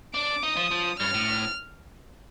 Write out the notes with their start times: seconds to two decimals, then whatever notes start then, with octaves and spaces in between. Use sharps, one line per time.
0.14 D4 D6
0.43 D#4 D#6
0.57 F3
0.71 F3
1.00 G2 F6
1.14 A2